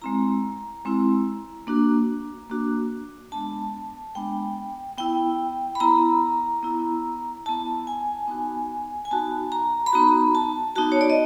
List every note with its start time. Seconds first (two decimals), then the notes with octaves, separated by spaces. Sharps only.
0.02 G#3 C4 E4 A#5
0.85 G#3 C4 E4
1.67 A#3 D4 F#4
2.50 A#3 D4 F#4
3.32 G#3 B3 D4 A5
4.15 G#3 B3 D4 G5
4.98 B3 E4 G5
5.75 B5
5.80 B3 E4 A#5
6.63 B3 E4
7.46 B3 E4 A5
7.87 G#5
8.28 B3 D#4 F#4
9.05 G#5
9.11 B3 D#4 F#4 A5
9.52 A#5
9.86 B5
9.93 B3 D#4 F#4 A#5
10.35 A5
10.76 B3 D#4 F#4 A5
10.92 C#5
11.01 D5
11.10 D#5